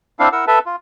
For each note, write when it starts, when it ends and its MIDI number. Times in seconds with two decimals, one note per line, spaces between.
0.19 0.29 60
0.19 0.29 62
0.19 0.29 64
0.19 0.29 77
0.32 0.45 64
0.32 0.45 70
0.32 0.45 78
0.32 0.45 88
0.47 0.59 69
0.47 0.59 71
0.47 0.59 76
0.47 0.59 81
0.66 0.76 65